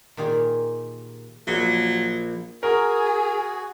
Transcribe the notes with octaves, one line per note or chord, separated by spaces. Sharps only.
A#2 D#3 G4 G#4 G#5
A#1 F#3
F#4 G#4 A#4